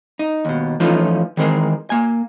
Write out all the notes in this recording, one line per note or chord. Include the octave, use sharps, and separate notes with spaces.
D#4
D#2 B2
E3 F3 A3 C#4 D#4 F4
D#3 E3 G#3 C4 A#4
A#3 G#5